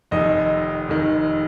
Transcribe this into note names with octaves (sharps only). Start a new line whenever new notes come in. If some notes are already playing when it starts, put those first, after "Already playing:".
F1 F2 D#3 D#5
F1 F2 D#3